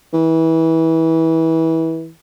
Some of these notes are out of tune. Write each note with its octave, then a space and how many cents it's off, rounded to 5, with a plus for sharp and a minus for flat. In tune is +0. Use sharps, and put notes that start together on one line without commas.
E3 -25